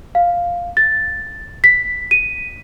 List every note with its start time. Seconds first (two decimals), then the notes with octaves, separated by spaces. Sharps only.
0.15 F5
0.77 A6
1.64 B6
2.11 D#7